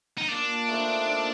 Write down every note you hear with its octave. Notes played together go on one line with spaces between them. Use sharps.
D#4
A#2 D4
A3 C4 D#4
A#2